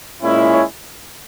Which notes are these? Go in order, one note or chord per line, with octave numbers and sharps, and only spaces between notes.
A#2 G#3 C#4 E4
C#5